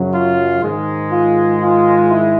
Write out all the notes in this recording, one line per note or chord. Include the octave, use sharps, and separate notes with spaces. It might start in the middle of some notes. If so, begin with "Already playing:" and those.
Already playing: F#2 C#3 F#3
F4
G#2 D#3 G#3
F4
F4
E4